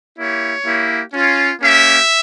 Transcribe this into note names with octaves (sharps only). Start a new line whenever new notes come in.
A#3 E4 G4 C#5
A#3 E4 G4
C#4 F4
A#3 C#4 G4 E5